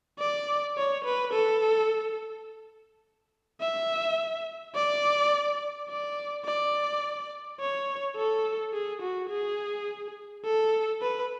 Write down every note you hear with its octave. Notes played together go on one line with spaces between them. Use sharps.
D5
C#5
B4
A4
E5
D5
D5
D5
C#5
A4
G#4
F#4
G#4
A4
B4